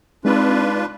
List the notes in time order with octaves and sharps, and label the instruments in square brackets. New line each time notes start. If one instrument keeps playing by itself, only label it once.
[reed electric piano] G#3 D#4 [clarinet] C4 [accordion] D4 F4 B4